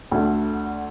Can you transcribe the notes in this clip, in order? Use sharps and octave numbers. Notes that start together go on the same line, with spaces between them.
D2 D3 A3